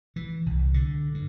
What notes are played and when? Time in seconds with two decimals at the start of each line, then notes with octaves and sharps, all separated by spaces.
0.16 E3
0.46 C2
0.74 D3
1.14 G2